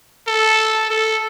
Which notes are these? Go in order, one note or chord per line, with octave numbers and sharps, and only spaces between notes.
A4
A4